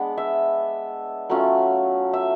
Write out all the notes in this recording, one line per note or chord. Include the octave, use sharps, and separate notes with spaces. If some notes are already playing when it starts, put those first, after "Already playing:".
Already playing: G#3 B3 D4
E5
F#3 A3 C#4 F4
E5